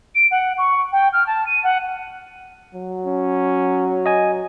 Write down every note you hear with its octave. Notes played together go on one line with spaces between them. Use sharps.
D7
F#5
C#6
G5
F6
A5
D#7
F#5
F#3
C#4
D#5 G#5